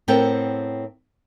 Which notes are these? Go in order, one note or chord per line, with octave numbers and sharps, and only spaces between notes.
A2 B3 C4 A4 A#4 G5